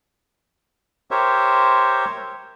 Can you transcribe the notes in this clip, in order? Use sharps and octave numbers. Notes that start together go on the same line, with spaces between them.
G4 A#4 C5 C#5 E5